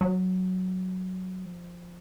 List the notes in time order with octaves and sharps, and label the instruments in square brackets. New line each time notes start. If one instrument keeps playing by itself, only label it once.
[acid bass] F#3
F3